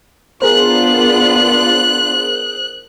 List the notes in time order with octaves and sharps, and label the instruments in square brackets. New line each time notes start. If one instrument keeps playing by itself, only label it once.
[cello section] B3 D4 F4 [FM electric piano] G#4 A#4 C5 [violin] F#6